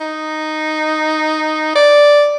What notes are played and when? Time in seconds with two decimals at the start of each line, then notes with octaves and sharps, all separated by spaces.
0.01 D#4
1.75 D5